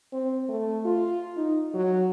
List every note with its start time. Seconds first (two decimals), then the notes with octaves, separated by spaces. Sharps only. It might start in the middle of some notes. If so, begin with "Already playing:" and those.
0.12 C4
0.49 A3
0.85 F4
1.37 D#4
1.74 F#3